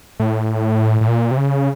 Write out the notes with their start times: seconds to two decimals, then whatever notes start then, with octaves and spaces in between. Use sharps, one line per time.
0.20 A2
1.01 A2
1.08 A#2
1.31 C3
1.37 C#3